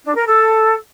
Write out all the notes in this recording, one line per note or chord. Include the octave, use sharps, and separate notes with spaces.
D4
A#4
A4